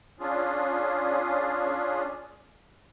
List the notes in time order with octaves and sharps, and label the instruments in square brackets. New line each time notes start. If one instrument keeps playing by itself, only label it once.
[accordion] C#4 D4 F4 G#4